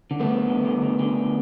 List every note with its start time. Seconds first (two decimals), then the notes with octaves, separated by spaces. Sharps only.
0.11 D3
0.20 A3 B3
0.29 D3
0.47 D3
0.65 D3
0.82 D3
0.99 D3